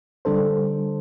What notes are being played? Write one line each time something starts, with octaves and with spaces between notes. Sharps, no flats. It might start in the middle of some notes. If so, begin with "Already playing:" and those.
D3 G3 D4 A4 C5